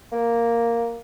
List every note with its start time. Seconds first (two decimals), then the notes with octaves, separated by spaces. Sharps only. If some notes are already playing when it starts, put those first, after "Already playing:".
0.12 A#3